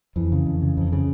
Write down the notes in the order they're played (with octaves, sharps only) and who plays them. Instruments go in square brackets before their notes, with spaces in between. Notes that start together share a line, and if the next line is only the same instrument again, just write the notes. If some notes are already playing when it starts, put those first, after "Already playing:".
[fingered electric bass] F2 E3
C#3
F2
C#3
F2
C#3